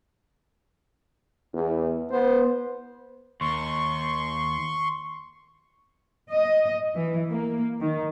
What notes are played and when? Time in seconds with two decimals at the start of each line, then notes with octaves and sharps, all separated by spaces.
1.54 E2
2.11 B3 C5
3.41 D#2 C6 C#6
6.31 D#5
6.95 E3
7.30 A#3
7.80 D#3